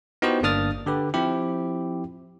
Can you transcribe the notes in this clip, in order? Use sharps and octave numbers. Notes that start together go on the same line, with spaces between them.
B3 D#4 E4 F#4 G4 C5
G1 A#3 D4 D#6 F6 A6
D3 G4 B4
F3 C4 E4 G4